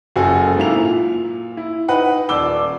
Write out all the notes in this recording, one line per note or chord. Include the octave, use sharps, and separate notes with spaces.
F#1 F#4 G#4 A4
G#2 A#3 E4 F7
A#2
E4
D#4 B4 F#5 B5
D#1 D5 D6 E6 G7